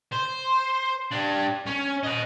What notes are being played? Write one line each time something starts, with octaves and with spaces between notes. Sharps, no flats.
C5
D4 G4
C#4
D#5 F#5